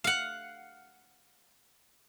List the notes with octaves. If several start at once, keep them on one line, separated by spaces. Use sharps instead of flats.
F5 F#5